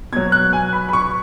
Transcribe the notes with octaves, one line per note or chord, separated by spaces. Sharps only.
B2 F#3 G#6
F#6
G#5
B5
B5
C#6